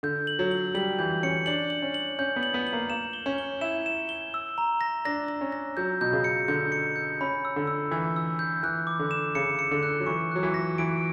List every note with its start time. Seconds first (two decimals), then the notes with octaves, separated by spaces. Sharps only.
0.03 D3 G6
0.27 F#7
0.39 F#3
0.51 F#7
0.74 G3 F#7
0.99 E3 G6
1.23 C#4 C#7
1.46 D4 F#7
1.70 F#7
1.82 C#4
1.94 F#7
2.19 C#4 G6
2.36 B3
2.43 F#7
2.54 B3
2.67 F#7
2.73 A#3
2.90 A#3 E7
3.13 G7
3.26 C#4
3.38 G7
3.61 E4 E7
3.86 E7
4.09 G7
4.34 E6
4.58 A#5
4.81 A#6
5.05 D4 A#6
5.28 A#6
5.41 C#4
5.52 A#6
5.77 F#3 G6
6.01 B2 G6
6.13 C#3
6.24 C#7
6.48 D3 G6
6.72 C#7
6.96 G6
7.21 C#4 B5
7.45 E6
7.56 D3
7.67 E6
7.91 E3 E6
8.16 E6
8.39 G6
8.63 E3 F#6
8.87 D6
8.99 D3
9.11 E7
9.35 C#3 C#7
9.59 C#7
9.71 D3
9.83 F#6
10.00 F#3
10.06 E3 C#6
10.31 F#3 F#6
10.43 E3
10.54 A#6
10.78 E3 D7